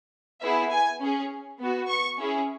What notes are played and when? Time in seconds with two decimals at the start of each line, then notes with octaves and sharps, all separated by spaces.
0.41 B3 E4 G#4 E5
0.71 G#5
1.00 C#4 G#4
1.59 B3 F#4
1.88 C#6
2.17 C#4 E4 G#4